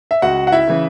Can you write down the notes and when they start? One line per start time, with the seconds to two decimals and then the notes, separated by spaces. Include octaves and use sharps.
0.11 E5
0.22 C#2 F#4 F#5
0.47 F#5
0.52 E4 E5
0.67 C#3 E3